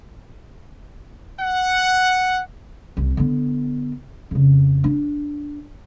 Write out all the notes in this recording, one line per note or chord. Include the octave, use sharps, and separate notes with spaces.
F#5
C2
D3 B3
F2 C#3
D4